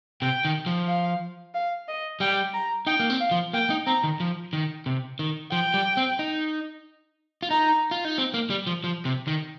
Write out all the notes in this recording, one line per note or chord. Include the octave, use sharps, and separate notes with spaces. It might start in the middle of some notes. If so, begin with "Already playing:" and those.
C3 G5
D#3
F3
F5
F5
D#5
G3 G5
A#5
D#4 G5
A#3
C4
F5
F3
A#3 G5
D#4
C4 A#5
D#3
F3
D#3
C3
D#3
F3 G5
G3
C4
D#4
F4
D#4 A#5
F4
D#4
C4
A#3
G3
F3
F3
C3
D#3